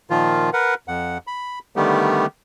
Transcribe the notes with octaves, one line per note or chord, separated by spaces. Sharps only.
A#2 D#3 F3 F4
A#4 B4 F#5
F2 F#5
B5
D3 D#3 G3 A3 B3 G4